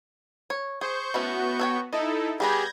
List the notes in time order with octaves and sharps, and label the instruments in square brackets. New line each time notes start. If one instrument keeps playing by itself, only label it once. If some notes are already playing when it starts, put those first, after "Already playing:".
[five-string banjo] C#5
[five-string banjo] G#4 [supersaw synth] C5 [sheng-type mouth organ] C#6 G6
[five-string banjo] E3 A3 C#4 [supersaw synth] B3 F#4
[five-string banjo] A4 C#5 G5
[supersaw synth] D#4 E4 A4 [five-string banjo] D#5
[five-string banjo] G3 B3 B4 [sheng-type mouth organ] G4 G#4 [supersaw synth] G6 G#6 A#6